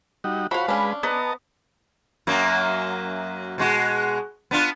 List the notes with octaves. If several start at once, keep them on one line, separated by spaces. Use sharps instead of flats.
G3 D#4 F#4
F3 F#4 C#5 F5 B5
G#3 C#4 D4 B4
B3 D#5 A5 A#5
F#2 F#3 A#3
B2 G#3 F#4
B3 D4 F4